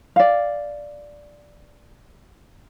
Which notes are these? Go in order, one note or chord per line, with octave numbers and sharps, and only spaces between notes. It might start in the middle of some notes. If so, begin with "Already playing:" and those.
D5 F5